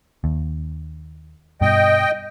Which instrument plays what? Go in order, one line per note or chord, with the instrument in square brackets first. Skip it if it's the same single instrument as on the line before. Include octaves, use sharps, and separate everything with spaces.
[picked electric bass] D#2
[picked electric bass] G2 B2 [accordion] D#5 G5